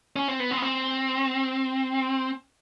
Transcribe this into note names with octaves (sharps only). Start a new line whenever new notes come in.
C#4
C4
B3
C4
B3
C4